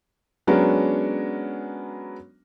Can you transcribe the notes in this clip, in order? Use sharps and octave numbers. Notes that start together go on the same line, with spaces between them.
F#3 G#3 B3 C#4 D4 A#4